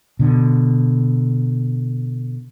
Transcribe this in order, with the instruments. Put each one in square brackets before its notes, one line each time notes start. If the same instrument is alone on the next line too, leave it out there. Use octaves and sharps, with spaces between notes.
[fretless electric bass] B2 D3